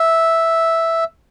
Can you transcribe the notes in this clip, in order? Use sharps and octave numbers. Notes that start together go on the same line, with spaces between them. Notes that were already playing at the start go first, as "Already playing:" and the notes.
Already playing: E5